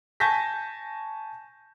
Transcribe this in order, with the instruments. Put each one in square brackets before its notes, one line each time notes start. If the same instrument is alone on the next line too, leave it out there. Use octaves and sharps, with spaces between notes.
[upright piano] G#5 A5 C#6 G6 A#6 B6